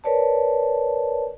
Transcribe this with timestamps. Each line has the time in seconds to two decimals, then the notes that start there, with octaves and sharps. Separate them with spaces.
0.04 A#4 B4 C#5 D5 A5